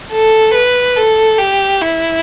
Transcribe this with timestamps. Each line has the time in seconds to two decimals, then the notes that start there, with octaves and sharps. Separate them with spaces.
0.11 A4
0.54 B4
0.96 A4
1.38 G4
1.81 E4